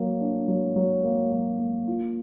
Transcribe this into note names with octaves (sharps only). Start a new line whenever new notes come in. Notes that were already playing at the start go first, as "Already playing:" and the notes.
Already playing: F#3 A#3
D4
F#3
F#3
A#3
F#3
A#3
F4